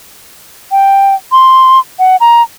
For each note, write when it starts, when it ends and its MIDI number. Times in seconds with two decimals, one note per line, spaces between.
0.72 1.15 79
1.32 1.79 84
1.99 2.16 78
2.20 2.42 82